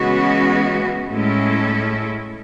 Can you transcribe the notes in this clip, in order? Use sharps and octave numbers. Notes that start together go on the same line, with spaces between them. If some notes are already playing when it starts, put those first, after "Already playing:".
Already playing: C#3 E3 G#3 B3 F#4
A2 G#3 C#4 E4 A4